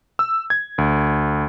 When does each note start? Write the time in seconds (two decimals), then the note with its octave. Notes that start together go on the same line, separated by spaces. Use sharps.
0.19 E6
0.50 G#6
0.78 D2